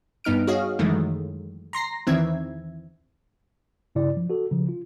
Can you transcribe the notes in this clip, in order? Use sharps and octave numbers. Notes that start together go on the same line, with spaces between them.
G2 B3 D#4 F6 D7
F#4 G#4 C#5 D#5 F5
F#2 D#3 E3 G#3 A3
A#5 C6 A#6 C7
E2 D#3 E3 C4 E5 G#6
G2 C#3 E4 D5
F3
F#4 A4
C#3 F3
F4